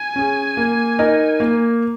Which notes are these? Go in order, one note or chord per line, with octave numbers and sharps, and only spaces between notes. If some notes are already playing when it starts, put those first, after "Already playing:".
Already playing: G#5
C#4 G#4
A#3
D#4 A#4 D#5
A#3